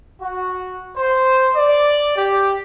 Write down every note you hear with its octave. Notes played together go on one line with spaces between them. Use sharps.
F#4
C5
D5
G4